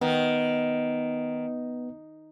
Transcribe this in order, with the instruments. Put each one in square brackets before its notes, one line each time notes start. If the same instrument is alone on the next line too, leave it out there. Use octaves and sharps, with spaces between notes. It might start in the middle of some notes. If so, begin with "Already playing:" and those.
[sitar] D#3 [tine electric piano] B3